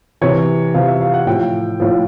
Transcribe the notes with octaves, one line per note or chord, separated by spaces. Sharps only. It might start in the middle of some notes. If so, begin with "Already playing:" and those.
C3 E3 C#5
C3 E3 F5
E5
F5
F#5
A2 F3 G5
A2 F3